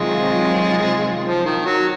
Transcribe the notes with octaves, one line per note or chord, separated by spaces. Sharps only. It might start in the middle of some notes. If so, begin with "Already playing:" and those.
Already playing: C3 D#3 F#3 G#3 C4 F4
F3
D#3
F#3